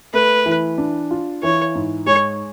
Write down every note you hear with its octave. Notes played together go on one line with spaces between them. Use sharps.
A3 B4
E3
D4
F4
E3 C#5
G#2
G#3 C#5